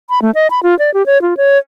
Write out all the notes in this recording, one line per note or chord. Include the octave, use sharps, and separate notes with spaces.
B5
A3
D#5
B5
F4
D5
G4
C#5
F4
C#5